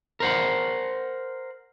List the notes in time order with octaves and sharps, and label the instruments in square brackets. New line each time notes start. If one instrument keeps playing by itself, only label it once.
[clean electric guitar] A#4 C5 F#5